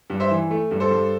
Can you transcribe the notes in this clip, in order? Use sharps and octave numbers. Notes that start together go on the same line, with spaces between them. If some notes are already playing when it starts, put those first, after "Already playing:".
G2
C5 E5
E3
A3
G2
A4 C5
G2